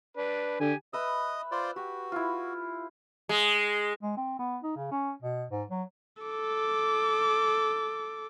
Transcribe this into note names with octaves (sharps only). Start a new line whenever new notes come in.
D4 B4
D3 G4 G#5
B4 D#5 E5 D#6
F4 C5 D5
F#4 G4
E4 F4
G#3
G#3
C4
B3
D#4
C#3
C#4
B2
G#2
F#3
A4 D6